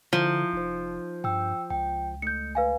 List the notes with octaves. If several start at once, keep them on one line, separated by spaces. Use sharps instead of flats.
D3 F3 E4
F1 D#4 C5
G2 G5 E6
C#2 G5
A3 G6 C#7
B4 F5 G#5